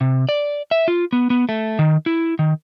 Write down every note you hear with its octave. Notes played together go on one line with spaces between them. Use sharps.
C3
D5
E5
F4
B3
B3
A3
D#3
E4
D#3